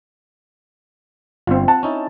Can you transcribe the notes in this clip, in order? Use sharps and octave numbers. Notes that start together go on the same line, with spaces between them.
G1 C4 F4
F#5 A5
C#4 D#4 E4